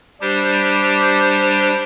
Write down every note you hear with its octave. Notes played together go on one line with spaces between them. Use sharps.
G3 D4 G4 C5